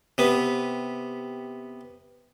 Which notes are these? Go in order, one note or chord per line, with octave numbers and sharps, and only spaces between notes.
C3 B3